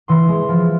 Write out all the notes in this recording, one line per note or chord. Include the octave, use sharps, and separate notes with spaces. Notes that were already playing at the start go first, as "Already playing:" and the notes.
E3 C6
G#3
F3